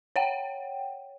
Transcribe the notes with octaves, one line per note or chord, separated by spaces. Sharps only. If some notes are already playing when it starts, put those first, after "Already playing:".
C#5 F#5 G5